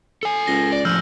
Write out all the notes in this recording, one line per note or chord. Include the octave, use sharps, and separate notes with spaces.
A4 G#5
C#2 A#6 G7
D5
A2 F3 E6 F6 G6